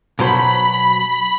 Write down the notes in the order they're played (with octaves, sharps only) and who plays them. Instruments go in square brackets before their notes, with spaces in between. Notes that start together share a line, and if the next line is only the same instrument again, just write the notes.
[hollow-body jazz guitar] B2 F#3 C5 [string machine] B5